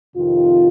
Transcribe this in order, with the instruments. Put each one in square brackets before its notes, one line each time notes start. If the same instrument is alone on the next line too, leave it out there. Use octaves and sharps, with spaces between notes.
[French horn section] F2 C3 D#3 F4